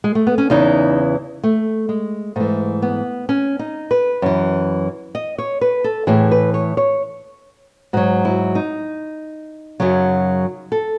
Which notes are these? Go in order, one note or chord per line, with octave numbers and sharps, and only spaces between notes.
G#3
A3
B3
C#4
E2 C#3 E3 D#4
A3
G#3
G#2 E3 A3
B3
C#4
D#4
B4
F#2 E3
D#5
C#5
B4
A4
A2 E3 G#4
B4
C#5
C#5
G#2 F#3 F#4
E4
D#4
F#2 C#3 F#3
A4